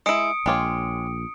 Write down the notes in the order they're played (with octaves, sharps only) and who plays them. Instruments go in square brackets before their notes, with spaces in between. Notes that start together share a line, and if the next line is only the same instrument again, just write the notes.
[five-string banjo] G#3 E4 [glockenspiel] D#6 C#7 D7
[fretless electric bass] A#1 [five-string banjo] G#3 F4 C#5 [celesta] G5 D6